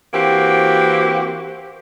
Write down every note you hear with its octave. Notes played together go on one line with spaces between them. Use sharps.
E3 A#3 C4 F#4 G4